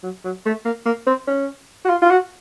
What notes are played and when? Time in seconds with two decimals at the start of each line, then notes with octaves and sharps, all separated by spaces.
0.03 F#3
0.25 F#3
0.46 A3
0.65 A#3
0.86 A#3
1.07 C4
1.27 C#4
1.85 F#4
1.89 F4
2.02 F4
2.11 F#4